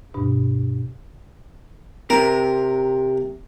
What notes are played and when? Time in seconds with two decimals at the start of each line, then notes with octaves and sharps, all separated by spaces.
0.14 D2 G2 B2 D4
2.10 C3 A#4